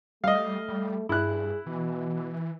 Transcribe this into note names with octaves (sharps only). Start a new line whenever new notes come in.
G3 A3 D#5 F5
G3
G2 E4 G#4 F#6
B2 E3